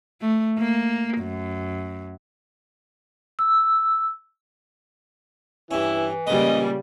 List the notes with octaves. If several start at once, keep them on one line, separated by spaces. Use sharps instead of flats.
A3
A#3
F#2
E6
G2 E3 C#4 E4
A#2 C#3 G3 G#3 B4 D#5